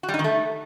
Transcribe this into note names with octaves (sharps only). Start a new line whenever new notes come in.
F#4
G3
D#4
D#3
A3